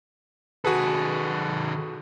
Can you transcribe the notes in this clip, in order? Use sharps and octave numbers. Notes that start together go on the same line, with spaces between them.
D#3 F#4 G#4 A4 B4